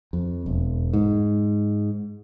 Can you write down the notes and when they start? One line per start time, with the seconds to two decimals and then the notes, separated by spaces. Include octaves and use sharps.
0.13 F2
0.46 E1
0.93 G#2